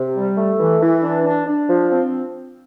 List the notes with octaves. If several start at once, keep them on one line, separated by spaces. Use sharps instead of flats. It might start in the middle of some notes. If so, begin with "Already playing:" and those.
Already playing: C3
G3
A3
E3
E3
D4
D4
D4
F3
C4